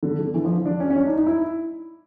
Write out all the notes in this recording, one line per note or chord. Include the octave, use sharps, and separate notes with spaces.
D3
D3
E3
F3
D4
C#4
C#4
D4
D#4
D#4
E4